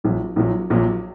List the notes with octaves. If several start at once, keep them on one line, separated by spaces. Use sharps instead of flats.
A#1 A#2 F#3
A#1 A#2 F#3
A#1 A#2 F#3